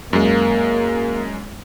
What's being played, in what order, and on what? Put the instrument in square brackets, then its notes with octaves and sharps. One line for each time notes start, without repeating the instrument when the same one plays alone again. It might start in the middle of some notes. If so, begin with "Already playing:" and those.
[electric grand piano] F#2 G#3 [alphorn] A#3